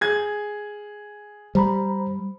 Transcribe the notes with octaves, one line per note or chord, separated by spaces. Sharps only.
G#4 G#6
G3 C5 A#5 B5